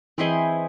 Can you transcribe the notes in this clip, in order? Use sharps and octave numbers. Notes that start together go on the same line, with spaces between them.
E3 C4 E4 G#4 D#5